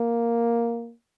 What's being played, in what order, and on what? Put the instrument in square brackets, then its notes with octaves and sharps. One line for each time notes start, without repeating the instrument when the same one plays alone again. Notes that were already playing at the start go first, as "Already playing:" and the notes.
Already playing: [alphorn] A#3